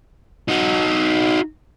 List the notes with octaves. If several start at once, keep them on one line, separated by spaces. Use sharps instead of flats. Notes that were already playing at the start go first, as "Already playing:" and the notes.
D#4 F#4